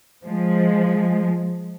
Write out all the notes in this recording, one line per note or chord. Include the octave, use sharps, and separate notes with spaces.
F3 G#3